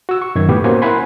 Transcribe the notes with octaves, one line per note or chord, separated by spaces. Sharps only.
F#4 E6
C#6
F#2 D#3 G#6
A2 B3 G4
A#3 C#4 F#4 C5 G#5
E4 A#4 F#5 G#5 B5 C6